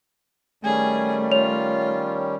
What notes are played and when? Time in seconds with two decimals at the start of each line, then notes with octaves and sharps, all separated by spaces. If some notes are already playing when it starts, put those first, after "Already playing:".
0.64 D#3 G3 A3 C#4 G#4
1.32 F4 C#5 F7